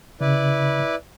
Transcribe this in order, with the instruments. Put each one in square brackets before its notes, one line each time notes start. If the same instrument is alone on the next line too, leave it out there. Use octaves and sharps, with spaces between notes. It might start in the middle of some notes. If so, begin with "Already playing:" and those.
[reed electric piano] C#3 [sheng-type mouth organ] E4 B4 D5